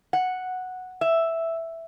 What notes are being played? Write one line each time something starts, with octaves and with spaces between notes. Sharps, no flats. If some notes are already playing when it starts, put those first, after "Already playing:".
F#5
E5